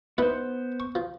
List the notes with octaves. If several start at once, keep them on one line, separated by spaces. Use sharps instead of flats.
B3 D#4 E4 B4 C5
C#6
F3